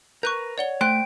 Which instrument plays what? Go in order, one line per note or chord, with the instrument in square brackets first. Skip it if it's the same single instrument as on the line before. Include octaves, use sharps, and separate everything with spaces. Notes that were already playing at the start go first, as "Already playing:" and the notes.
[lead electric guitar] A#4 B4 [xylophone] C#6 F#6 G6
[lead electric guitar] C#5 [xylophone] D5 F#5 G7
[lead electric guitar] A3 [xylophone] C5 C6 F#6 [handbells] G5 [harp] D7